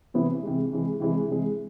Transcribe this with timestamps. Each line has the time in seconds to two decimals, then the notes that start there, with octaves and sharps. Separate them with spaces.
0.14 C3 E3 B3 E4
0.43 C3 E3 G#3
0.71 C3 E3 G#3
1.00 C3 E3 G#3
1.28 C3 E3 G#3